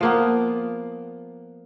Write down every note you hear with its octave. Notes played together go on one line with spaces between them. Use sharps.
F3 A#3 B3